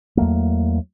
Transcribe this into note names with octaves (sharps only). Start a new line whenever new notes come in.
E2 F#3 A3 A#3